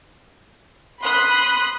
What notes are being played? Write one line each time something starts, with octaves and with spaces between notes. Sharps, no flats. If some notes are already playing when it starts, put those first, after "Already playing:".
B5 C6 D#6 F#6